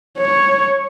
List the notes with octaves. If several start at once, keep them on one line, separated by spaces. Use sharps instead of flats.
C#5